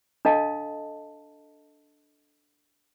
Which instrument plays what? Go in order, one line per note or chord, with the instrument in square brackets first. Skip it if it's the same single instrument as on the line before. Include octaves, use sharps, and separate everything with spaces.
[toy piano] D4 A4 D#5 F5 A5